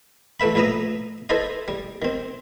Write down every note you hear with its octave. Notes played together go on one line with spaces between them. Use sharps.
A1 A3 B4 E5 B5
A#1 A2 B4 E5 A#5 D#6
E4 A4 B4 C5 D#5
G3
D#3 C4